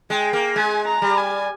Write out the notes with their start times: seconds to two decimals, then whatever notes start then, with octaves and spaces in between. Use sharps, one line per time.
0.10 G#3 G5
0.33 A#3
0.56 G#3 G#5
0.87 A#5
1.02 G3
1.17 G#5